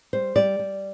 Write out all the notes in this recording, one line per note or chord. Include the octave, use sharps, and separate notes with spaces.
G3 C5
G3 D5
G3